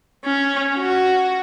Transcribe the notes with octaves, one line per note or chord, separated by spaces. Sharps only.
C#4
F#4